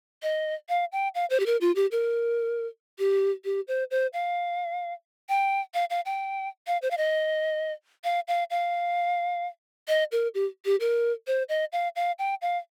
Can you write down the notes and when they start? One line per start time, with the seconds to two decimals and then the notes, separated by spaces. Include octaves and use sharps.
0.23 D#5
0.69 F5
0.92 G5
1.15 F5
1.30 C5
1.40 G4
1.46 A#4
1.61 F4
1.76 G4
1.91 A#4
2.99 G4
3.45 G4
3.68 C5
3.91 C5
4.13 F5
5.29 G5
5.74 F5
5.90 F5
6.05 G5
6.67 F5
6.82 C5
6.91 F5
6.97 D#5
8.04 F5
8.28 F5
8.50 F5
9.88 D#5
10.12 A#4
10.34 G4
10.65 G4
10.80 A#4
11.27 C5
11.49 D#5
11.72 F5
11.96 F5
12.19 G5
12.42 F5